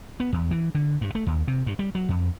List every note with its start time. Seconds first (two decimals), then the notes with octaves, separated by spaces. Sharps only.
0.20 B3
0.33 E2
0.51 E3
0.75 D3
1.01 G2
1.15 A3
1.27 D#2
1.48 C3
1.66 G2
1.79 G3
1.95 F#3
2.09 F2